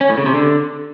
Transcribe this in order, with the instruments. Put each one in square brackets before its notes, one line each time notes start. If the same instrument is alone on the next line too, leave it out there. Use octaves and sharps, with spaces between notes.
[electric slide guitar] C#4
A2
C#3
C3
D3